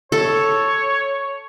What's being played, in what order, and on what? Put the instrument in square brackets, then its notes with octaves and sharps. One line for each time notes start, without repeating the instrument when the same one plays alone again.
[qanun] A4 [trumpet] C#5